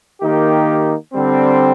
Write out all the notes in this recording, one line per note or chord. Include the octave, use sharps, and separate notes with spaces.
D#3 A#3 D#4 G4
D3 G3 C4